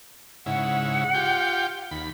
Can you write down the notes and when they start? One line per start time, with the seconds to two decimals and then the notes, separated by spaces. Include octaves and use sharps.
0.46 G#2 C#3 E4 F#5
1.14 F4 G4 G5
1.91 D#2 B5